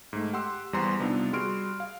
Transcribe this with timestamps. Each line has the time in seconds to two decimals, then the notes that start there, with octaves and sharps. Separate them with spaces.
0.13 G#2 A3
0.33 G4 F#5 C6 E6
0.73 E2 G3 B3 C5 A#5 C6
0.99 C3 G3 B3 D4 D#4 F4
1.33 G3 F#4 G#4 C6 F6 D7
1.80 F5